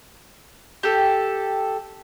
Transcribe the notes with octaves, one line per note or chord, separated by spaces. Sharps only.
G4 A4